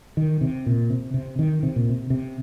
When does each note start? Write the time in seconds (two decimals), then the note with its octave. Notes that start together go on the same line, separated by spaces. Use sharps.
0.17 D#3
0.41 C3
0.66 A#2
0.90 C3
1.14 C3
1.39 D#3
1.63 C3
1.76 A#2
1.89 C3
2.10 C3